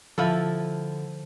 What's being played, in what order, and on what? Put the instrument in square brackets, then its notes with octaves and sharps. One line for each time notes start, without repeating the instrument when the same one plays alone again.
[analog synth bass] D3 [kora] F3 E4 A4